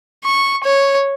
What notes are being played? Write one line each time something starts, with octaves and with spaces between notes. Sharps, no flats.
C#6
C#5